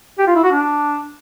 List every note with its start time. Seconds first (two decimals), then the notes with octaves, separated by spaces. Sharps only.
0.18 G4
0.27 F4
0.35 E4
0.44 F#4
0.52 D4